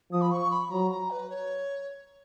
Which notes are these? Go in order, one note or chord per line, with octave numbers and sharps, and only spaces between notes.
F3 D#6
B5
C#6
B5
F#3 A#5
A#5
B4
C#5